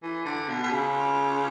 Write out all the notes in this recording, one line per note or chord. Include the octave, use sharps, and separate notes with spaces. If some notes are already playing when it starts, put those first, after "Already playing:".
E3
D3
B2
B2
C#3